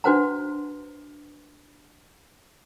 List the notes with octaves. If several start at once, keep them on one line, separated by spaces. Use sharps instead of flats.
D4 F#4 B4 C5 F#5 A#5